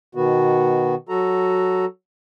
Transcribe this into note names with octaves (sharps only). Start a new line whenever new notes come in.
B2 D#3 B3 F#4
F#3 F#4 A4 A#5